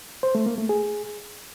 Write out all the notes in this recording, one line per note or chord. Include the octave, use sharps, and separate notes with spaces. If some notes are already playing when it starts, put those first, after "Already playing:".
C5
A3
A#3
A3
G#4